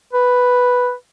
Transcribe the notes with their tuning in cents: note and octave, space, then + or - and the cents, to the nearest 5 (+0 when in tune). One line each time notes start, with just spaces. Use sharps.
B4 +0